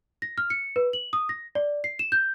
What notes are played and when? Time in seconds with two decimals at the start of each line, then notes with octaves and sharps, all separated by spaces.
0.22 A#6
0.38 F6
0.50 C#7
0.76 B4
0.93 F#7
1.13 D#6
1.29 A#6
1.55 D5
1.84 C7
1.99 E7
2.12 G6